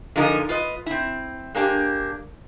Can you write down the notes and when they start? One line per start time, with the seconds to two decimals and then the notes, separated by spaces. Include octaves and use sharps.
0.16 D3 F3 G#3 D#4 F4 A#4
0.49 F4 B4 D#5
0.86 C4 E4
1.55 G#3 A#3 D4 G4